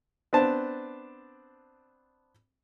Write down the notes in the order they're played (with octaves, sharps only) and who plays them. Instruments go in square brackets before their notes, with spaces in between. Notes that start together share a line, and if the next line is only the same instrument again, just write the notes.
[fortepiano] B3 C4 D4 C5 A5